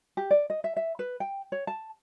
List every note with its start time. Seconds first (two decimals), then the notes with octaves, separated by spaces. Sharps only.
0.17 G4
0.31 D5
0.50 D#5
0.64 E5
0.77 E5
0.99 B4
1.20 G5
1.52 C#5
1.67 A5